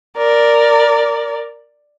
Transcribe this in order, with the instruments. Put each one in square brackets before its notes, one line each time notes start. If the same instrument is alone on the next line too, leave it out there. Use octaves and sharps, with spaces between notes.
[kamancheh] A#4 D5